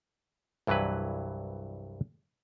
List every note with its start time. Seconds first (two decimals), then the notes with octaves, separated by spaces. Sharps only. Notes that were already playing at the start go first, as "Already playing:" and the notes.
0.67 C2 G2 E3 F#3 B4